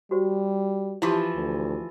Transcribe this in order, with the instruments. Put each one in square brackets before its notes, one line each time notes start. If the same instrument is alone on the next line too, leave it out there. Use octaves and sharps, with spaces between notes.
[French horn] G3 [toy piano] F#4 G4 C5
[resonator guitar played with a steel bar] E3 F3 [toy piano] E4 G4
[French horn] D2